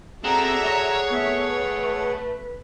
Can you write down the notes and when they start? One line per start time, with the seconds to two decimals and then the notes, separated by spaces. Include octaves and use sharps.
0.24 C4 F#4 G#4 A4 D5 E5 F#5 A#5
0.66 C#5
1.10 A3 B3 E5
1.50 B4